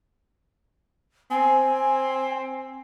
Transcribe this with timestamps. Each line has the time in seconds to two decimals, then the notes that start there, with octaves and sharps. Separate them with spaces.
1.31 C4 G#5